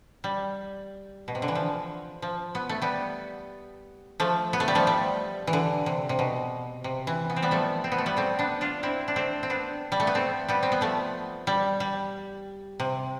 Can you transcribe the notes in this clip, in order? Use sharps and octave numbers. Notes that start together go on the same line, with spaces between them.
G3
B2
C3
D3
E3
F3
F3
B3
A3
G3 B3
F3 A3
B3
A3
G3
F3 A3
G3
E3
D3
C3
C3
B2
C3
E3
B3
C4
G3 B3
F3 A3
C4
B3
A3
G3 B3
A3 C4
B3 D4
D4 F4
C4 E4
D4
A3 C4
C4
B3 D4
G3
A3
B3
A3 C4
G3 B3
C4
B3
F3 A3
G3
G3
C3